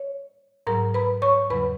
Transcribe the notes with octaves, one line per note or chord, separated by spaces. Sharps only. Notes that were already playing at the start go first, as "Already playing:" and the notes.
Already playing: C#5
G#2 F#3 A#4 A#5
B4 B5
C#5 C#6
E2 C#3 F#3 B4 B5